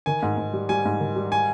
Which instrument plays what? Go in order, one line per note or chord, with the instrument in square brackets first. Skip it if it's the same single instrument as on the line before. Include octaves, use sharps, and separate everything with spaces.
[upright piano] D#3 [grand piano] G#5
[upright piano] G#2
G#2
G3
[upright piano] G3 [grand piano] G#5
[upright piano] G#2
D#3
G3
[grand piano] G#5